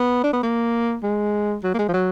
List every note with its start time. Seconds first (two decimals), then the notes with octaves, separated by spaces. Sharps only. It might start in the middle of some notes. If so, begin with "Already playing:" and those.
Already playing: B3
0.24 D4
0.33 B3
0.43 A#3
1.03 G#3
1.63 F#3
1.74 A#3
1.79 G#3
1.88 F3
1.94 F#3